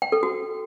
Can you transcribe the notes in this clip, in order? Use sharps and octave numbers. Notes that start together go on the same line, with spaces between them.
G5
A4
F#4